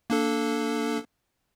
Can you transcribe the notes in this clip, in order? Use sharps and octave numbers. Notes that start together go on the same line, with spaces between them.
A#3 D4 A4